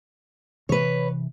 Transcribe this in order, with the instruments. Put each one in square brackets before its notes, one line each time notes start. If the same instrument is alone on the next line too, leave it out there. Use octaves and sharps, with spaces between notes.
[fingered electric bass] C3 E3 [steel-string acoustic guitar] B4 C#5